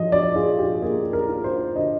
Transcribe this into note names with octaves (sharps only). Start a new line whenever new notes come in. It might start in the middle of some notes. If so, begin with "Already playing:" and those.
Already playing: F3 D#5
D5
F4 G#4
G4
A#3 G#4
A#4
F4
C5
D3 D#5